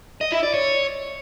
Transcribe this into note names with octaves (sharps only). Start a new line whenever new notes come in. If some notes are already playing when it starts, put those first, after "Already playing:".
D#5
E4
D5
C#5